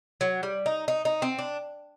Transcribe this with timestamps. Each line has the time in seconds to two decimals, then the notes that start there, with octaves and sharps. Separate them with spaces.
0.21 F#3
0.43 G3
0.66 D#4
0.88 D#4
1.05 D#4
1.22 C4
1.39 D4